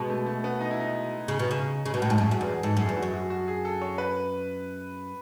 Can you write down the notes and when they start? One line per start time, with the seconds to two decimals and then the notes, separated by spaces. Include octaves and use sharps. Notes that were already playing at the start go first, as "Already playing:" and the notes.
Already playing: B2 G#3
0.10 A3
0.26 A3
0.44 B3
0.60 D#4
0.71 E4
0.80 D#4
1.28 C#3
1.39 B2
1.51 C#3
1.85 C#3
1.94 B2 F#4
2.02 A2
2.10 G#2 E4
2.18 F#2
2.24 G#4
2.29 F#2 F#4
2.41 E2
2.46 G#4
2.63 G#2 A4
2.77 F#2 G#4
2.89 E2
2.97 F#4
3.03 F#2
3.14 F#4
3.30 F#4
3.48 G#4
3.65 A4
3.82 C#5
3.98 B4